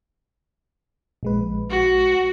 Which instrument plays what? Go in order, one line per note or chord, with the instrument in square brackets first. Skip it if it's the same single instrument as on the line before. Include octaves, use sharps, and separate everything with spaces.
[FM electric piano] A#1 G#3 B4
[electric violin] F#4